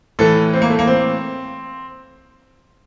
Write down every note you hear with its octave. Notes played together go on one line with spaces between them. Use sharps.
A2 E3 A4
C4
A#3
A3
A#3
C4